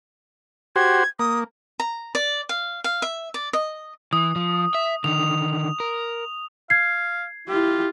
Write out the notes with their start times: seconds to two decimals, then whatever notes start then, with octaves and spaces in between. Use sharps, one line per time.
0.76 F#4 G4 C5 G#6
1.19 A#3 D#6
1.80 A#5
2.15 D5
2.49 F5
2.84 F5
3.02 E5
3.34 D5
3.53 D#5
4.13 E3 D#6
4.36 F3
4.75 E5
5.04 D3 D#3 F7
5.80 A#4
6.70 F5 G#6 C7
7.48 E4 F4 G4